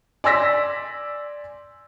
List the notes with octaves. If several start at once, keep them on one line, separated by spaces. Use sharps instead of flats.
D5 G#5 C6 E6 A#6 B6